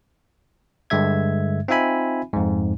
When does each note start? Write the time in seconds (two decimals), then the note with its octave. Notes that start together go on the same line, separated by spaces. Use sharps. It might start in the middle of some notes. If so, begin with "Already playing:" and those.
0.90 G2 D3 G#3 E5 G#6
1.68 C4 D#4 F4 E5 G#5 B5
2.33 F2 G#2